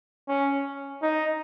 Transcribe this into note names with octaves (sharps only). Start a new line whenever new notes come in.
C#4
D#4